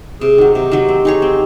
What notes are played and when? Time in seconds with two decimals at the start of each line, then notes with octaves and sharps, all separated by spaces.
0.21 C3 G#4
0.38 D#3 F#3
0.54 C3 G4
0.72 D#3 F#3
0.88 C4
1.05 D#4 G#4 C#5
1.22 C4